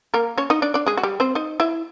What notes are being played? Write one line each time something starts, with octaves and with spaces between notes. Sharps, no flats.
A#3 A#4
C#4 C#5
D#4 D#5
D4 D5
D4 D5
G#3 G#4
F#4
G3 G4
C4 C5
D#4 D#5
E4 E5